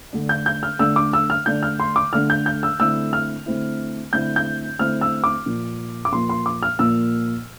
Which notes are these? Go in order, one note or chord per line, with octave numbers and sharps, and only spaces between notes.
D3 A3 D4
G6
G6
F6
D3 A3 D4 E6
D6
E6
F6
D3 A3 D4 G6
F6
C6
D6
D3 A3 D4 F6
G6
G6
E6
D3 A3 C4 E4 E6
F6
D3 A3 C4 E4
D3 A3 C4 E4 G6
G6
D3 A3 C4 E4 F6
E6
D6
A#2 F3 A#3
D6
A#2 F3 A#3 C6
C6
D6
F6
A#2 F3 A#3 E6